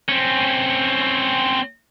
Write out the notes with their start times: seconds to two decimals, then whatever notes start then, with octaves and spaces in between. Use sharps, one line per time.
0.08 C4 C#4